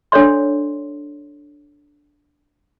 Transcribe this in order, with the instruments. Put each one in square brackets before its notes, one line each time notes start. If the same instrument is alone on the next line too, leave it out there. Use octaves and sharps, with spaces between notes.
[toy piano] D4 A4 C#5 D5 C6